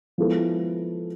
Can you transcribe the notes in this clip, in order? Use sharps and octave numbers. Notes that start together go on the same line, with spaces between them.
F3 G#3 B3 E4 A4